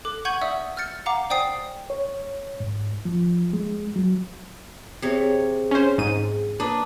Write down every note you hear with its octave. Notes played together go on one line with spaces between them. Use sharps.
A4 D6 F#6
F#5 C#6 G6 G#6 D#7 F#7
D5 E5 F#5 D#6 E6
E6 F6 G6 A6 C#7
F5 F#5 A#5 D6
C5 D5 G5 G#5 D#6 C7
C#5
G#2
F3
G#3
F#3
C3 G#4 C#5
C#4 C5
G#2 D#7
A#3 D4 B4 D6 D#6